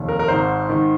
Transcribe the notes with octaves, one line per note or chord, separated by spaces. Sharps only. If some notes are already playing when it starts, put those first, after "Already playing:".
Already playing: F1 D#2
A#4
A#4
G#1 G#2 D#3 C5
G#2 D#3